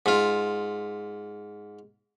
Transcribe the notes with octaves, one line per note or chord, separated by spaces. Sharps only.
G#2 F4